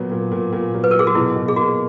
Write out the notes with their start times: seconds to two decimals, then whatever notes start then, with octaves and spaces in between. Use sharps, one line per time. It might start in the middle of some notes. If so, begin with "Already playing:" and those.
Already playing: A#2 F#3 B3
0.11 A#2
0.32 A#2
0.53 A#2
0.74 F#3
0.84 B4
0.91 A#4
0.94 F#3
0.99 G#4
1.07 F#4
1.15 B2 E4
1.36 B2
1.48 G#4
1.56 A#3 F#4